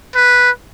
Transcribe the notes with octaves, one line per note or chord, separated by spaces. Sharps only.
B4